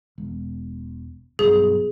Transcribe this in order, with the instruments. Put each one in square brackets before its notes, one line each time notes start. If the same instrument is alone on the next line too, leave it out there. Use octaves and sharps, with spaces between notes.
[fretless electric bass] E1
[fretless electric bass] B1 G2 B2 [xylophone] G#4